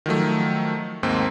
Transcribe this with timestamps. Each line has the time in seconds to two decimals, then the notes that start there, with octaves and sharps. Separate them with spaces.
0.06 D#3 F3 F#3 A3
1.03 D#2 G#2 A#3 C4